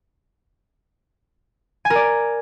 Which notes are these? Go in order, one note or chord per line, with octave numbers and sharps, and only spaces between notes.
G#5
A#4
D5